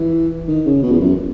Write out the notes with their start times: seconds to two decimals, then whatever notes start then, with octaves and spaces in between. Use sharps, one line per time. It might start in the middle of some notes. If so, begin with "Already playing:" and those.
Already playing: E3
0.48 D#3
0.66 C#3
0.83 B2
0.92 E2
1.00 F#2